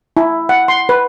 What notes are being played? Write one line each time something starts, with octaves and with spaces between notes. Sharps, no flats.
E4
F#5
C6
B4